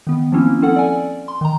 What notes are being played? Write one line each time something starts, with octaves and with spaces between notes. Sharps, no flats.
D#3 B3
F3 A#3 C4 C#4 E4
C4 C#4 A4 F#5
D5 G#5
C6
D#3 A#5